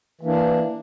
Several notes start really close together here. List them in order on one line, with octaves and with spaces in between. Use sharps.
E3 A#3 D4